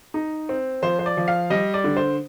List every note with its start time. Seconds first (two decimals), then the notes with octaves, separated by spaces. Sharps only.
0.14 D#4
0.49 C4
0.82 F3 C5
0.99 C5
1.06 D5
1.17 F3
1.28 F5
1.50 G3 D#5
1.74 D5
1.84 D3
1.97 C5